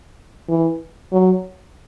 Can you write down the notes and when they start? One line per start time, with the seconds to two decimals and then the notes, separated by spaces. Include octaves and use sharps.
0.49 E3
1.12 F#3